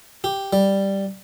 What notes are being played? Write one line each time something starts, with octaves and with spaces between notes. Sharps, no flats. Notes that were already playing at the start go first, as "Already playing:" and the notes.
G4
G3